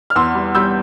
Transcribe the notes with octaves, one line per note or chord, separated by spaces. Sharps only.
F6
E2 C6 E6
G3
G3 E6 G6